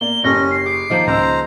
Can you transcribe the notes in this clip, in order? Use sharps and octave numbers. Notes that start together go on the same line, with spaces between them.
A#3 D5 G7
F#1 C#4 G4 A4 A#6
C7
G#4 D6
D#3 F3 A#3
C#2 G#3 A#4 C5 A#5 E6